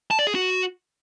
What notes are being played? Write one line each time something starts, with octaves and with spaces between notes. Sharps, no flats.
A5
D5
G#4
F#4